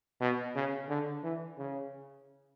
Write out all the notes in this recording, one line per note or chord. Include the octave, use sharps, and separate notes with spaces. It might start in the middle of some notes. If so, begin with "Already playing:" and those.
B2
C#3
D3
E3
C#3